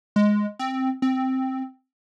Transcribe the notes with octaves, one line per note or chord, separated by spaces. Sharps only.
G#3
C4
C4